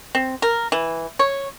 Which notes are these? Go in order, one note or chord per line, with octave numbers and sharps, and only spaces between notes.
C4
A#4
E3
C#5